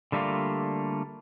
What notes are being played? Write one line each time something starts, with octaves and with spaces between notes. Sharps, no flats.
D3 G3 A3 A#3 F4